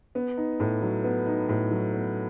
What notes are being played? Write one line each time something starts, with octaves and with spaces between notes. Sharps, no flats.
B3
D#4
A2
F#3
B3
D#4
A2
F#3
B3